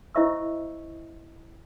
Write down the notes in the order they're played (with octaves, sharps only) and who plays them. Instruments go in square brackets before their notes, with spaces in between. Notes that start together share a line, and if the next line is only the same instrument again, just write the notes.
[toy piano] E4 C5 D#5 E5 C#6 E6